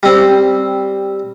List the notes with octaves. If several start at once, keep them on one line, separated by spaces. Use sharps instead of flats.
G3 C4